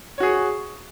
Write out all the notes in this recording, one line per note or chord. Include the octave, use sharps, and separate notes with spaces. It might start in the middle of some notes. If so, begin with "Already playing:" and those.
F#4 G#4 C#5